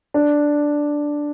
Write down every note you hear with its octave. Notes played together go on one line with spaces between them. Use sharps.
D4